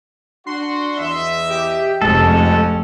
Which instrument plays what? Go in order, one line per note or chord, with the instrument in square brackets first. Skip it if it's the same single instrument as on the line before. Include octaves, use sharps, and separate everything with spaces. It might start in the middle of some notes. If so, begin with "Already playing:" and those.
[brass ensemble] D4 F#4 [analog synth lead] C6
[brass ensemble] E2 D#5 E5
[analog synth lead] G4
[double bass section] F1 [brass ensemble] F2 C#4 [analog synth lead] G#3 [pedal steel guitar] A4